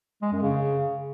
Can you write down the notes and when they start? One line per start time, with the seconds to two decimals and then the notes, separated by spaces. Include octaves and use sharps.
0.22 G#3
0.32 F#2
0.42 C#3